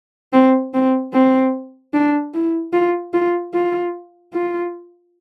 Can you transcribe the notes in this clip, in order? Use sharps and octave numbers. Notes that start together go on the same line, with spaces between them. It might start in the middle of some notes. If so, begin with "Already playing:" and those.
C4
C4
C4
D4
E4
F4
F4
F4
F4